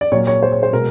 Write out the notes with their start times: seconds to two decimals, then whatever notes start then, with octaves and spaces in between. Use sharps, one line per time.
0.01 D5
0.12 A#2 F#3 A#3 C#5
0.27 C#5
0.43 C5
0.52 C#5
0.63 C5
0.73 B2 G#3 A#4